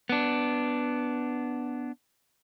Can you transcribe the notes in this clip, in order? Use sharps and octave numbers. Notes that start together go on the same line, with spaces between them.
B3 D4